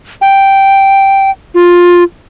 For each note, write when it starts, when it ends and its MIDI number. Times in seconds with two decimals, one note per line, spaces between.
0.21 1.30 79
1.55 2.03 65